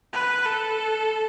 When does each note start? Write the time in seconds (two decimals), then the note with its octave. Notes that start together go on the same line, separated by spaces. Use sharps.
0.13 B4
0.45 A4